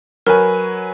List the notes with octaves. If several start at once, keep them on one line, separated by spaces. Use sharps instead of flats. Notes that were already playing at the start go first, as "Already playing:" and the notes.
F#3 A#4 B4 G#5